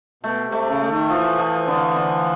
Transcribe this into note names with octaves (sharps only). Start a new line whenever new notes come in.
B2 A3
C3
A3
C#3
A3
D#3
E3 F3
F3
D3
D3